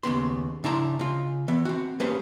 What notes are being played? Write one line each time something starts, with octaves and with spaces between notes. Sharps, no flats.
D#2 C#3 B3 C6
C#3 D4 E4 A#5 C6
C#3 F4
E3 B3
C4 F#4
G3 A#3 C#4 G#4 B4 C5